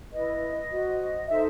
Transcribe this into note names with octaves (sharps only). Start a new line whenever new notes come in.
E4 B4 D#5
F#4 C5
D#4 A4 C5 E5